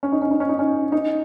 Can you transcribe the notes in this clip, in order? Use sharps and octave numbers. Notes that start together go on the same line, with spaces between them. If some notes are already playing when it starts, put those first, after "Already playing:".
C#4
D#4
C#4
D#4
C#4
D#4
C#4
D#4